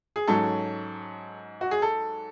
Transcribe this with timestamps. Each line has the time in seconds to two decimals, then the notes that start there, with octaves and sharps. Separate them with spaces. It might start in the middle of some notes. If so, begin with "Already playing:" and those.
0.16 G#4
0.28 G#2 F#3 C#4 A4
1.61 F#4
1.71 G#4
1.82 A4